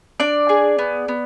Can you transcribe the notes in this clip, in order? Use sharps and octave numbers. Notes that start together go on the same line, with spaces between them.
D4 D5
G#4
B3
B3